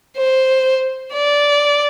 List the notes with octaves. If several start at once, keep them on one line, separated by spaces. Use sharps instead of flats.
C5
D5